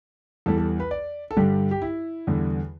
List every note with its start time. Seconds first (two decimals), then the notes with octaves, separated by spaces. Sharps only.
0.46 E2 E3 G3 A4
0.58 A4
0.80 B4
0.91 D5
1.31 A4
1.36 G2 D3 G3 G4
1.71 G4
1.82 E4
2.27 E2 D3 G3